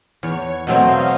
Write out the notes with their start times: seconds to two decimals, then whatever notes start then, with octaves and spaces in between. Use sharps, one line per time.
0.23 E2 C#5
0.44 C#5
0.67 B2 F#3 A3 C4 D#5
0.89 F5